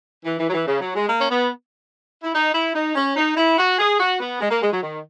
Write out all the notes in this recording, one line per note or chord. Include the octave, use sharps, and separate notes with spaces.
E3
E3
F#3
E3
C#3
F#3
G#3
A#3
C#4
B3
E4
D#4
E4
D#4
C#4
D#4
E4
F#4
G#4
F#4
B3
G#3
A#3
G#3
F#3
D#3